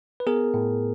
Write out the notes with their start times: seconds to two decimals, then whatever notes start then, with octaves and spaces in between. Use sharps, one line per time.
0.20 B4
0.27 B3 G#4 A#4
0.54 A2